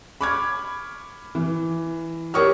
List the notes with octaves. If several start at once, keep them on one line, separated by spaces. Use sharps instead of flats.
B5 C#6 D6 F6 G#6
E3
G4 A#4 C#5 C#6 D#6 F6